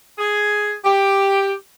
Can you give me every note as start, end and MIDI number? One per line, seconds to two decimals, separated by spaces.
0.18 0.73 68
0.85 1.53 67